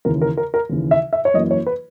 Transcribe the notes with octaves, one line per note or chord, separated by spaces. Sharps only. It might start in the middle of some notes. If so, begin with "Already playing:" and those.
D#2 C#3 E3 A#4
A#4
A#4
A#4
D#2 C#3 E3
E5
E5
C#5
F#2 E3 A#3 D#5
C#5
B4